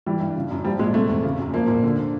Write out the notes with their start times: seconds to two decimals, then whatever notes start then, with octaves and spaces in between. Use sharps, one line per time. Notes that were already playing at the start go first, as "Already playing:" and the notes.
0.06 E3 G3
0.20 G2
0.36 C#3
0.51 F#2
0.64 F3 G3
0.79 A#2 G#3
0.94 C3 A3
1.09 E2
1.24 C#3
1.39 F#2
1.54 F3 A#3
1.68 A#2
1.83 D3